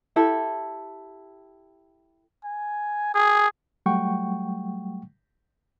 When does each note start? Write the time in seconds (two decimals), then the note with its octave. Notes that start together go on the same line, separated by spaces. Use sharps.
0.16 E4 G4 A4
2.45 G#5
3.14 G#4
3.86 F#3 G3 A3 F#5 G5 C#6